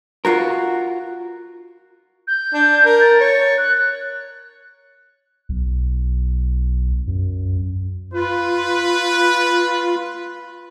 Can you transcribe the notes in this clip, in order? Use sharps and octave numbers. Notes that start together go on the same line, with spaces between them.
F4 F#4 A#4
G6
D4
A#4
A6
C#5
F#6
B1
F#2
F4 B4